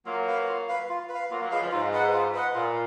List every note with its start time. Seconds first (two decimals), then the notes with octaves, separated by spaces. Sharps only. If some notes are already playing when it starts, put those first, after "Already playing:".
0.06 F#3 A#3 F4
0.27 B4 F5
0.48 F4
0.68 B4 F5
0.89 F4
1.09 B4
1.14 F5
1.30 F#3 A#3 F4
1.41 F#3 A#3
1.51 F3 G#3 B4 F5
1.61 C#3 F3
1.71 G#2 F4
1.93 B4 D#5 F#5
2.14 F4
2.34 B4 D#5 F#5
2.55 A#2 F4